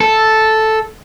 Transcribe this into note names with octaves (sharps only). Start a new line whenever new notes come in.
A4